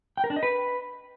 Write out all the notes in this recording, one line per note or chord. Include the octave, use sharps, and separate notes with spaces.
G5
A#4
D4
D#5
B4